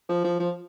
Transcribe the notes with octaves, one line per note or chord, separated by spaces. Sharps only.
F3
F3
F3